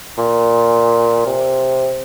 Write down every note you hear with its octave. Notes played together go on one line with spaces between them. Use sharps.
A#2
C3